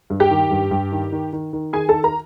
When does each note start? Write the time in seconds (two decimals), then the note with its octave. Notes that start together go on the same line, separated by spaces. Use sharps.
0.10 G2
0.20 G4 G5
0.30 D#3
0.51 G2
0.71 G2
0.92 D#3
1.12 D#3
1.33 D#3
1.53 D#3
1.73 D#3 G#4 G#5
1.89 D#3 A4 A5
2.04 A#4 A#5